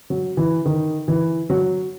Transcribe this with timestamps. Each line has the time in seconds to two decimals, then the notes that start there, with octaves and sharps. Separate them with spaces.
0.10 F#3
0.37 E3
0.66 D#3
1.08 E3
1.50 F#3